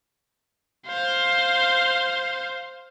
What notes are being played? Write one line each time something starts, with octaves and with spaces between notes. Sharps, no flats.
C5 F5